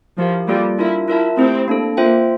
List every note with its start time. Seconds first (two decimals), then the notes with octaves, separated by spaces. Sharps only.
0.18 F3 E4 G4 A#4 F5
0.48 G3 A#3 F4 A4 D5
0.79 D4 E4 F4 A#4 E5
1.08 E4 F4 A#4 E5 A5
1.38 A3 C4 E4 G4
1.68 A#3 D4 A4
1.97 A#3 F4 C5 E5 G5